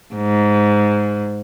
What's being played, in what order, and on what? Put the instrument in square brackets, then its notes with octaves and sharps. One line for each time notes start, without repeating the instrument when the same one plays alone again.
[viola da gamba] G#2